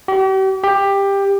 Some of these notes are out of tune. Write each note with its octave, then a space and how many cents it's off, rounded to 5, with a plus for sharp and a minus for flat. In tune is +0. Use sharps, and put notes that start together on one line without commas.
G4 -40
G4 +15